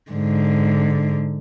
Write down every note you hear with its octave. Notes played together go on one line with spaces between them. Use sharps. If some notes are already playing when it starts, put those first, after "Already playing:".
G#2 D3